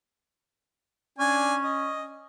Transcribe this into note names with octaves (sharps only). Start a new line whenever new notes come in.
C#4 D4 G#5
D#5